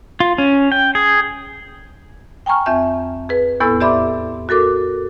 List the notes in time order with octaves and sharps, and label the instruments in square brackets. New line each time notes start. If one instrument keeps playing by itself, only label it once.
[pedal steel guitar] F4
C#4
G5
G#4
[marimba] G5 G#5 A#5 C#6 F6
F2 C4 E5 G6
G#4 B4
E2 A2 B3 E4 A4 E6
G4 D5 E5 B5 C6 D6
F#4 A4 A#4 D6